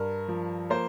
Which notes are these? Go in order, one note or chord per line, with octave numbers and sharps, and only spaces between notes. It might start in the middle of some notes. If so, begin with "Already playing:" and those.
Already playing: G2 A#4
F3
A#3 C5